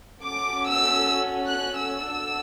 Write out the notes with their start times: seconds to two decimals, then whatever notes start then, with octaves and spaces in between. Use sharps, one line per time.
0.21 C#4 F#4 A4 D6
0.68 E6
1.46 F#6
1.77 E6
2.08 D4 F#4 A4